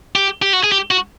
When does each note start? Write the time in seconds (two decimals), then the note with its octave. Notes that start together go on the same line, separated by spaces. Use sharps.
0.16 G4
0.42 G4
0.53 F#4
0.64 G#4
0.72 G4
0.91 F#4